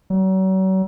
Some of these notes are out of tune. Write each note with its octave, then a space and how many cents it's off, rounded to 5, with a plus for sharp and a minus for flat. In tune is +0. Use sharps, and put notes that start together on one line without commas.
F#3 +40